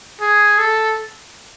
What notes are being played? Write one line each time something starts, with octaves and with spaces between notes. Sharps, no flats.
G#4
A4